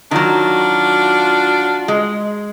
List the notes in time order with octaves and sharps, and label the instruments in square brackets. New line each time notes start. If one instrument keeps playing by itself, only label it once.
[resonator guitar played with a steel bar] D#3 F#3 [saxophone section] D4 F4 F#4
[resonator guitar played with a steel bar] G#3